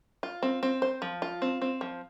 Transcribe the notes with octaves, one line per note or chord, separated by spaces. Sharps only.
F4
C4
C4
C5
F3
F4
C4
C4
F3